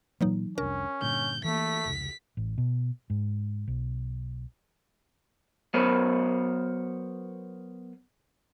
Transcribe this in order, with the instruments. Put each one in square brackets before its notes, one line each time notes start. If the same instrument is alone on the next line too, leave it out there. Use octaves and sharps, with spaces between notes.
[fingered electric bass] A#2 A#3 [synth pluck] E3 F#3 D#4
[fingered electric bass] F1 C2 D4 [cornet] C#4 [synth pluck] A#4
[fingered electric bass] G2 A#2 D3 [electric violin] G6
[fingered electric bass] E3 A#3 [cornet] A3 [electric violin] B6
[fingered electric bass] F1 C#2
A1
B2
G#2
B1
[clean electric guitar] F#3 B3 A#4 C5 C#5